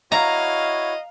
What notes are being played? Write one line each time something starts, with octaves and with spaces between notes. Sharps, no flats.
E4 F#4 C#5 D#5 F5 A#5